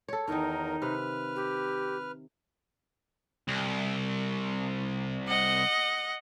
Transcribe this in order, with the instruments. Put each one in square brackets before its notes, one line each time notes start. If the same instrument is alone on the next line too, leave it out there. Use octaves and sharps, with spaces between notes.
[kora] A4 C#5
[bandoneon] E2 A#4 [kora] D#3 C#5 [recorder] D#4
[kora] C3 [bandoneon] B4 F6
[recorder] G4
[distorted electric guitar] C2
[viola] D#5 F#5